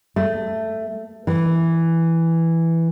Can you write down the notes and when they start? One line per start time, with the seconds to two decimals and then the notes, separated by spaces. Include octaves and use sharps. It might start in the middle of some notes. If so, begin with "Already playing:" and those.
0.16 A3
1.27 E3